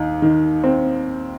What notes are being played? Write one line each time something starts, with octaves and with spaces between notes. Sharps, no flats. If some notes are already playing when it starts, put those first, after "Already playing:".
Already playing: D#2 D#4
D#3
C4